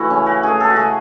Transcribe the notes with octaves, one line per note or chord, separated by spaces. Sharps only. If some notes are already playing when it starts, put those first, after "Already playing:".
Already playing: E3 A3 E4 F#4
C#3 C#4
F#4
E3 A3 G#4
A4
F#4
C#3 G#4